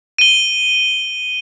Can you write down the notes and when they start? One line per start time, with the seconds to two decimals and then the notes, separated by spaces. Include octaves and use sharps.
0.19 D#7 G7